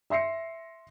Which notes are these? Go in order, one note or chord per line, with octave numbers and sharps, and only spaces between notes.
E5 C6 A#6 C7 C#7